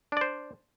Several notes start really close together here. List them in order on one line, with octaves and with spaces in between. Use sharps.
D4 D5 C5